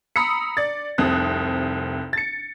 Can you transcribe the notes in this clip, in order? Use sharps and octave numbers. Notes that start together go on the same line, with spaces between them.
A#5 B5 D#6 E6 C#7
D5 A6
F1 C2 C3 C4 D#6 F#6
A6 C#7